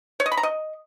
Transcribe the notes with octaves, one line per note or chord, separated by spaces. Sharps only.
C#5
D#5
B5
A#5
D#5